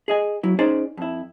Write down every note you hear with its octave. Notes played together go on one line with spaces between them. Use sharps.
G#4 D#5 G#5
F#3 E4
C#4 D#4 G#4 C5 D5
F2 E4